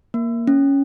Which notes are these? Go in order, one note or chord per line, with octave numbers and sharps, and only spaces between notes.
A#3
C#4